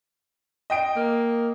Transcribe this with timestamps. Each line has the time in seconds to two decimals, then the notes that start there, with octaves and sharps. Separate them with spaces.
0.70 D#5 G5 D7
0.96 A#3